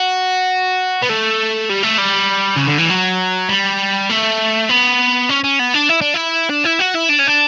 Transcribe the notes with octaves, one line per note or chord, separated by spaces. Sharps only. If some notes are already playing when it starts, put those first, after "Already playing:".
Already playing: F#4
B3
A3
G3
A3
G3
C#3
D3
E3
F#3
G3
A3
B3
C#4
C#4
B3
D4
E4
D4
E4
D4
E4
F#4
E4
D4
C#4
D4